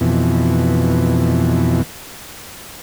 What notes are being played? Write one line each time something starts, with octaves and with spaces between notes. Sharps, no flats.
F2 B2 E3